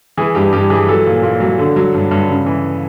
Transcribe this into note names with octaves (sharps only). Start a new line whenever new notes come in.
E3 G#4
G2 G4
G2 G4
E3 G#4
F#3 A4
A#2
A#2
F#3
D3
F#3
G2
G2
C#3
E3